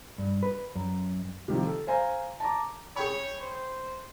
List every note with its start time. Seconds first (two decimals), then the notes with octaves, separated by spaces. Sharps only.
0.18 G2
0.43 B4
0.75 F#2
1.48 C3 D#3 F3
1.65 A4
1.87 C5 F5 G#5 A#5
2.40 A5 A#5 D6
2.96 G#4 C#5 G5 B5
3.41 C5